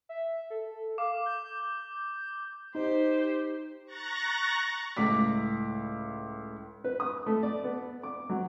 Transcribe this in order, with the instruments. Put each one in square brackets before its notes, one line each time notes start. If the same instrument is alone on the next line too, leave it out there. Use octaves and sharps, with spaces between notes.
[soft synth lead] E5
A4
[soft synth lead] F5 [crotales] D6
[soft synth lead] G6
[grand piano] D#4 [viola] G4 C5
[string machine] A#5 C#6 F#6 A6 A#6
[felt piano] C#2 A2 D6 B6
[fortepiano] B4
D#6
A3
D5
B3
D6
F#3